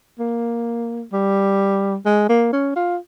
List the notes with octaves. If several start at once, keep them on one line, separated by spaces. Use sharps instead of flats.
A#3
G3
G#3
A#3
C#4
F4